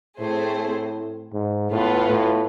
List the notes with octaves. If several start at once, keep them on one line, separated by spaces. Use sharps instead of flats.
A2 A3 C4 G#4 C5
G#2
A2 B3 F4 B4
A2